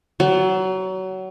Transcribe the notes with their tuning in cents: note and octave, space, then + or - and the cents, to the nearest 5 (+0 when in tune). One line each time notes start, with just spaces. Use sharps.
F#3 +25